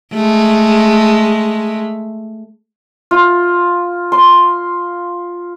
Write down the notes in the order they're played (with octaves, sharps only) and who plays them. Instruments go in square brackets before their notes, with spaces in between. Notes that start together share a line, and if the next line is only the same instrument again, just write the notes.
[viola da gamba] G#3 A3
[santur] F4
C6